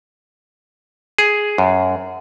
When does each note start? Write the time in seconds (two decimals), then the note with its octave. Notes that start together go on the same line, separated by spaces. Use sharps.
1.18 G#4
1.58 F#2